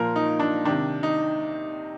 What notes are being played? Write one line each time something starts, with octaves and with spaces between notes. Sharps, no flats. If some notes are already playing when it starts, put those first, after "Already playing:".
Already playing: A#2 F3 A#4
D#4
D4
C3 D#3 D4
D#4